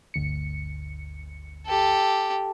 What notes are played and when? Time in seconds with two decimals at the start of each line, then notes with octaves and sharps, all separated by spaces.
0.14 G1 D2 C#7
1.66 G4 A4